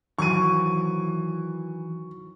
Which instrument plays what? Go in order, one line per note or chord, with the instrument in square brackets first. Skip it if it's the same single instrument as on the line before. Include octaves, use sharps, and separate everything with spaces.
[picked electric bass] D#3 F#3 [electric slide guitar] E3 [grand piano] C#6 D#7